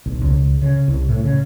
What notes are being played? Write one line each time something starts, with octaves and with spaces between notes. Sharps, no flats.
B1
C#2
C#3
C2
A2
C#3